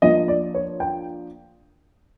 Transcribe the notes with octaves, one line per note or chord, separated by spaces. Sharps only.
F3 A#3 D4 F4 D#5
D5
C#5
G5